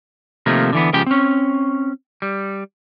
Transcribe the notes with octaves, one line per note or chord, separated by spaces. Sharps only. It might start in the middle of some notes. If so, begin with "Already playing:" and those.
C3 D#3 F3 A3 A#3
D3 E3 B3
C#2 C#3 F3 G4 G5
C4 C#4
G3